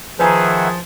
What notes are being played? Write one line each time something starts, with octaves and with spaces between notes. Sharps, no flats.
D#3 F3 G#4 B4 E5 F#5 G#5 A#5